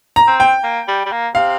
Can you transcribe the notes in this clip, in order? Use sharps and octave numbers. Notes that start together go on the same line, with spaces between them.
A#5
C4
G5
A#3
G3
G3
A#3
C3 F5